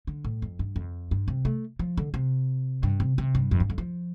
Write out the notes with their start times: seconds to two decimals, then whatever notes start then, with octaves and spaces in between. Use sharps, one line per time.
0.07 D3
0.25 A2
0.42 F2
0.59 G2
0.76 F2
1.11 G2
1.28 C3
1.45 A3
1.79 F3
1.97 D3
2.14 C3
2.83 G2
3.00 C3
3.18 C3
3.35 G2
3.51 F2
3.60 G2
3.70 F2
3.78 F3